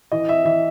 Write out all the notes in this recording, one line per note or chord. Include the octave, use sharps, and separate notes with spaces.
E3 D#5
E5
E3 E5